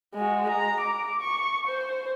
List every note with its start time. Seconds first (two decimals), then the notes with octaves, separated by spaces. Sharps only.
0.15 G#3 F#4
0.49 A#5
0.80 D6
1.22 C#6
1.67 C5